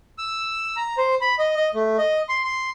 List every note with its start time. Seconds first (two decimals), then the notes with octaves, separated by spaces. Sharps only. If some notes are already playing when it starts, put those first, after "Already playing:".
0.18 E6
0.76 A#5
0.98 C5
1.21 B5
1.39 D#5
1.56 D#5
1.74 A3
1.98 D#5
2.29 C6
2.44 C6